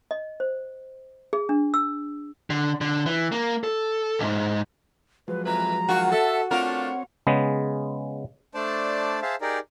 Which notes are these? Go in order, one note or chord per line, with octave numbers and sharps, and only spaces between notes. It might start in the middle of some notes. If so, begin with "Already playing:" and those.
D#5
C5
G#4
D4
E6
D3
D3
E3
A#3
A4
B1 G#2
F3 F#3 G#3 B4
F2 E3 B4 A#5
D#3 F4 F#4
A4 E5
A3 C4 D4 F4 A#4 C#5 F#5
C#3 G#3 B3
A3 D4 C5 D5 A5
G#4 C5 E5 F5 A5
D#4 G4 G#4 A#4 D5